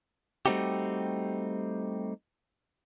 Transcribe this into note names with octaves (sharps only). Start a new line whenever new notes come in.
G3 A3 C4 D#4 F#4 G4